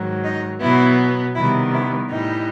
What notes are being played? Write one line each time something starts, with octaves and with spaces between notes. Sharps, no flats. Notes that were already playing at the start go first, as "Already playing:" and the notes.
Already playing: G#2 D#3 F#3
D#4
B2 F#3 B3 E4
C3 D#3 G3 B3 E4
E4
A2 E3 G3 D#4